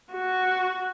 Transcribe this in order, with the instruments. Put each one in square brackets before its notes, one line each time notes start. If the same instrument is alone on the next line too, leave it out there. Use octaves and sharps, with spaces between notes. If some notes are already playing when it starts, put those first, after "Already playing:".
[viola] F#4